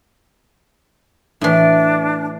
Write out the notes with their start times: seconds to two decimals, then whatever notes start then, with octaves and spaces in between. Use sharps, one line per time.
1.41 A2 E3 D4